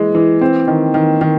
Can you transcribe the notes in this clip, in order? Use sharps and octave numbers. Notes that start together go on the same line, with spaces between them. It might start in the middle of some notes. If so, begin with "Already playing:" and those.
Already playing: E3 G#3
E3
C4
D#3
D#3
D#3